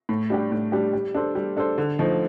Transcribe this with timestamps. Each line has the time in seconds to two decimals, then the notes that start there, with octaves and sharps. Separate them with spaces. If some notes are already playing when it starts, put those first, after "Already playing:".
0.09 A2
0.30 G3 D4 G4
0.52 A2
0.72 G3 D4 G4
0.93 G3
1.15 D4 A4 C5
1.35 G3
1.57 D4 A4 C5
1.78 D3
1.99 F3 A3 D#4